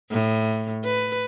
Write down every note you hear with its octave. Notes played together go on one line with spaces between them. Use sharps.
A2
B4